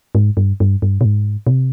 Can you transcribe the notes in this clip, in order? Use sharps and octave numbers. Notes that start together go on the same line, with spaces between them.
G#2
G2
G2
G2
B2
G#2
B2
C3